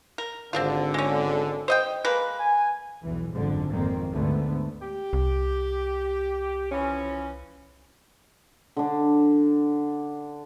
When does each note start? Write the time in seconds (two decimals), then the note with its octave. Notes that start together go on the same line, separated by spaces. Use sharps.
0.18 A#4
0.53 G#1 D3 C4 D4 F4
0.94 G#3 C#4
1.68 C5 D#5 G5
2.05 G#3 A#3 B4
2.39 G#5
3.02 B1 E2 E3
3.34 F#1 F2 G#2 D3 F3
3.70 G#1 F2 D#3 A#3 C4
4.11 D2 G#2 D3 A3 B3
4.82 G4
5.13 C2
6.71 E3 F3 C#4
8.77 D3 D4